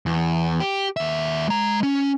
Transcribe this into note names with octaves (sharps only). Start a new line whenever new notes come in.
E2
G4
D#2 E5
G#3 A#5
C#4